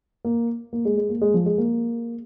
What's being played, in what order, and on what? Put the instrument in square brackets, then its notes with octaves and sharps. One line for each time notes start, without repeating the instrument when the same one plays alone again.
[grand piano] A#3
A#3
G#3
G#3
A#3
G#3
F3
G#3
A#3